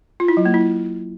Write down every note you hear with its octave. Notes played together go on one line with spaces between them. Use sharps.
F4
E4
F#3
A#3
E4